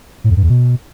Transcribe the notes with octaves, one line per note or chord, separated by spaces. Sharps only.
A2
F2
G2
E2
B2